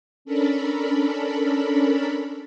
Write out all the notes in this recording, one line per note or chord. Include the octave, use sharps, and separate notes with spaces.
C#4 D4 A4 A#4 B5